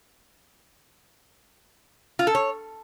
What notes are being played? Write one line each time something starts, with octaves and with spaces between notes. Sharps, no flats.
F4
A4
C#5